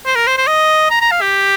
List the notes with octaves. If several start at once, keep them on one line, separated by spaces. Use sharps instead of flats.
C5
A#4
C5
C5
D#5
A#5
A#5
F5
G4